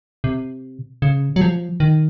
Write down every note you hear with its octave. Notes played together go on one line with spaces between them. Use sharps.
C3
C#3
F#3
F3
D#3